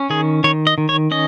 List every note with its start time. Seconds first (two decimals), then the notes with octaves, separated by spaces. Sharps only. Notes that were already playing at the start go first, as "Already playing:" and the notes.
Already playing: C#4
0.10 D#3 G#4
0.44 D#3 C#5
0.67 D#5
0.78 D#3
0.89 C#5
1.11 C#4 D#5